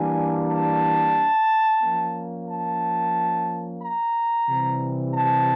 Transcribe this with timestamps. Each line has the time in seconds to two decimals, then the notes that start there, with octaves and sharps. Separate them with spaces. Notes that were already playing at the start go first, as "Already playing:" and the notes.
Already playing: E3 G3 A#3 D4 G#5
0.50 A5
1.82 F3 A#3 C#4
2.49 A5
3.82 A#5
4.48 C3 E3 G3
5.14 A5